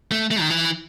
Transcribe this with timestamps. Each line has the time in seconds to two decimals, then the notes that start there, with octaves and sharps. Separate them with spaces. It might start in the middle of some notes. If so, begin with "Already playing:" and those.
0.12 A3
0.31 A3
0.41 D#3
0.50 E3